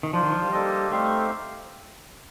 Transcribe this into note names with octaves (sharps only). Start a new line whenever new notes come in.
D#3
F3 D4 F4 C5
D#3
F3
G3
A#3 D4 A4 C5 D#5
A3 C4 D#4 G4 C5 F5